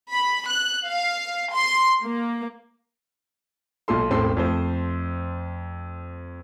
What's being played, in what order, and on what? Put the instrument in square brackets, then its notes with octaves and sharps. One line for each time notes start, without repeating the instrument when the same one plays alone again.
[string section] B5
F#6
F5
C6
A#3
[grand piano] B1 A#2 F4 A4 C6
E1 A1 A2 C4 A4 C6
F2 A3 C5